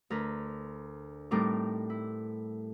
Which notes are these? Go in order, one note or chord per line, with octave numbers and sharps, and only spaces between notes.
D2 A#4 B4
A2 G3 C4 D#4 A#4 D6
E4